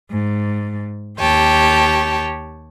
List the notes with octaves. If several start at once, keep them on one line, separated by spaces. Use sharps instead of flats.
G#2
D#2 G4 C#5 G5 A5